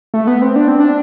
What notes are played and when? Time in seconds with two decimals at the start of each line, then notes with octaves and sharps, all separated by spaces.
0.14 A3
0.27 B3
0.42 C4
0.56 D4
0.68 C4
0.80 D4